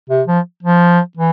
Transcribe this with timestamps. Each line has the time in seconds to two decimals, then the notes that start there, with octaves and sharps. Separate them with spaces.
0.10 C3
0.27 F3
0.63 F3
1.17 E3